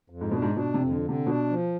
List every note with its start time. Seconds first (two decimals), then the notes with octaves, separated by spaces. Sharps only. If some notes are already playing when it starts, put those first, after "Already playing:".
0.10 F2
0.21 G#2
0.31 B2 D4
0.42 G#2
0.56 B2 D4
0.74 C3
0.80 F2
0.91 D3
1.03 D3
1.09 C3
1.27 B2 D4
1.49 F3